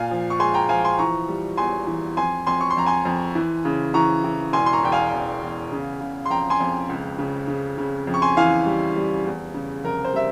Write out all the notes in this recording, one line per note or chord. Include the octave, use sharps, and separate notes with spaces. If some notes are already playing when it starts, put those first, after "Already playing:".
Already playing: A#2 F5 G#5
F3
C#6
G#3 G#5 C6
G5 A#5
F3 F5 G#5
G#5 C6
E3 A#5 C#6
G3
E2 G#5 C6
E3
F2 G#5 C6
F2 G#5 C6
C#6
C6
F2 A#5
G#5 C6
F2
E3
C#3
E3 A#5 C#6
E3
E1 G#5 C6
C6
A#5 C#6
E2 G5
F5 G#5
E2
E2
C#3
C#3
C6
F2 G5 A#5
G#5 C6
F2
C#2
C#3
C#3
C#3
F2
C#6
G#5 C6
E3 F5 G#5
G3
G3
E2
C#3
F1 A#4
C5
G3 E5